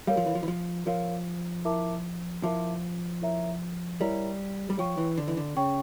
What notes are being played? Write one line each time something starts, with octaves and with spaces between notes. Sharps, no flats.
G3 A#4 C#5 F5
F3
E3
F3
E3
F3
F3 A#4 C#5 F5
E4 A#4 E5 A5 D6
F3 E4 A#4 E5 A5 D6
E4 A#4 C#5 E5 A#5
G3 E4 A#4 C#5 E5 A#5
G3
F3 C#5 G5 C#6
E3
D3
E3
D3
C#3 C#5 G5 C#6